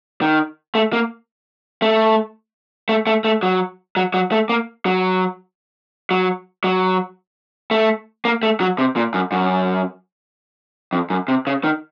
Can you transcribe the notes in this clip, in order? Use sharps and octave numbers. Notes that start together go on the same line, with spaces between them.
D#3
A3
A#3
A3
A3
A3
A3
F#3
F#3
F#3
A3
A#3
F#3
F#3
F#3
A3
A#3
A3
F#3
C3
A#2
F#2
F#2
F2
F#2
C3
C#3
D#3